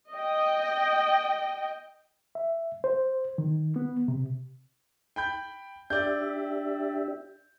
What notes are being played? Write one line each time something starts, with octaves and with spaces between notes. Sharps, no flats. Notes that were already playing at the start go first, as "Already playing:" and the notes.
D#5 G5
E5
C5
D#3
B3
C3
G5 B5 G6
D4 G4 D5 E5 G6